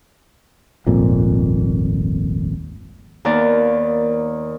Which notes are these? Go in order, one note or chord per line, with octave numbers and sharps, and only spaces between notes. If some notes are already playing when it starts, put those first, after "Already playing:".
D#1 G#1 F2 A#2
D#2 D#3 A#3 B3 D5